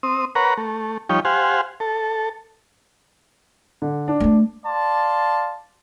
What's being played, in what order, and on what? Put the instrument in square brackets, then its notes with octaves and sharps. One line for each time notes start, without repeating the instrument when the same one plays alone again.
[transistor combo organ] C4 D#6
A#4 B4 C#5 F#5 A#5
A3
F3 G3 D#4 C#5 G5
G4 C5 F5 F#5 G#5
A4
[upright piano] D3
D4
[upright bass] A3 B3
[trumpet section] D5 F5 A5 C6